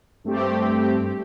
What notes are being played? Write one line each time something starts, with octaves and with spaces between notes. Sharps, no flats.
G2 A3 C4 G4